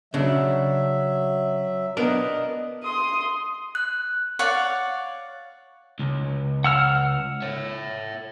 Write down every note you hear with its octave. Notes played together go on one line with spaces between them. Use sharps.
C#3 F#3 D4 E5
B3 D4 A#4 D#5
C6 D#6
F#6
C#5 D5 F5 F#5
C#2
F#5 E6 F6
C#5 E5